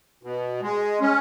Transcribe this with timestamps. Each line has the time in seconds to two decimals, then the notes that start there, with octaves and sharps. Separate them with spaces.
0.23 B2
0.62 G#3
1.01 C#4